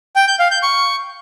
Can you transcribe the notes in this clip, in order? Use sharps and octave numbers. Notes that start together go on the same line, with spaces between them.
G5
G6
F5
G6
C#6